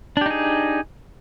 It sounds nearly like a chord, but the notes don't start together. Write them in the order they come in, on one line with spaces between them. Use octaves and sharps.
D4 G4 D#4 G#4